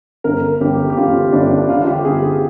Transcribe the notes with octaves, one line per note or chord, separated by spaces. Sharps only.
G1 A#4
G1 G4
G4
G1 F4
G1 D4
D3 F4
G4
G1 G#4
G#4